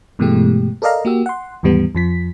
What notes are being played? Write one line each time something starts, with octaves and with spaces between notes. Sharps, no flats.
G2 B2 E3 G#3 A3 G4
A4 A#4 D5 D#5 F5 A#5
A#3 F#4 G4 E6
F#5 C6
D#2 G#2 E3 G3 B3
F2 F3 B6